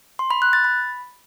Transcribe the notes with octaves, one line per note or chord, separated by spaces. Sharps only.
C6
B5
F#6
A6
B5